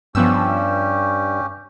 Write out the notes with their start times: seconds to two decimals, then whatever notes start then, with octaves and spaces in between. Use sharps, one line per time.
0.15 G2 F3 B3 C#4 G4 E6